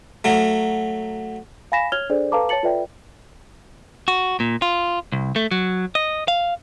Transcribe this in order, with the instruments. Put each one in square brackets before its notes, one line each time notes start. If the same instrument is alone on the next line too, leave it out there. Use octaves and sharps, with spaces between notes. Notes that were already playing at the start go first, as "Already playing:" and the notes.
[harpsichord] F#3 A3
[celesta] F5 G#5 B5 A#6 B6 E7
C#5 F6 G#6 F7 G7
D4 G#4 A4 C5 D5
A4 B4 F5 A5 A#5 D6
C#5 A5 A6 C#7 F#7
F4 A4 B4 D5 E5 G5
[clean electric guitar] F#4
A#2
F4
C2
A3
F#3
D#5
F5